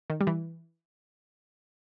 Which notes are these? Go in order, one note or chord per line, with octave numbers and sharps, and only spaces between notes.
D#3
G3
E3